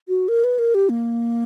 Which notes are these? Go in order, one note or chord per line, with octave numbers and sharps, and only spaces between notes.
F#4
A#4
B4
A#4
G4
A#3